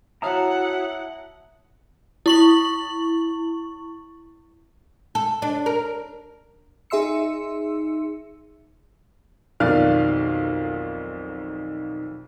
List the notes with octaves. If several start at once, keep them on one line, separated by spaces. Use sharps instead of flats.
E4 F#4 C#5 E5 F#5 A5 A#5 D#6
E4 C#6 F#7
A4
D4
A#4
D#4 G#4 E5 C6 E6 C#7
B1 F2 D#3 D5 F5 F6